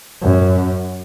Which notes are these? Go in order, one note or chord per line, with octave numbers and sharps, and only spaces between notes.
F#2